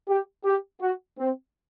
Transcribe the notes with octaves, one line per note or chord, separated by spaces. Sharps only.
G4
G4
F#4
C4